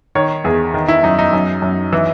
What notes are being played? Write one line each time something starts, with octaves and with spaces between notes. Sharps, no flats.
D#3 C#5
E2 G#4
D#3
E4
F#2 D#4
D#4
F#2
F#2
E3